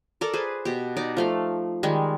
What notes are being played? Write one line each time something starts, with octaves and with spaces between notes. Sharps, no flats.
A4 A#4 D5
G#4 B4 C5
B2 G4
D#4 D5
F3 A3 F5
D#3 G3 G#3